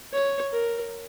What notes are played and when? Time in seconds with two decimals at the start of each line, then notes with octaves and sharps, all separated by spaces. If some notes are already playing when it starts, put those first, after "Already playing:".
0.13 C#5
0.53 A#4